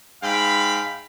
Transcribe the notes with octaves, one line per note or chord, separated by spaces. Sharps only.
G#2 F5 G5 B5